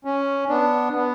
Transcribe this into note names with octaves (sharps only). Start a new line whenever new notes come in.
C#4
B3 D4
B3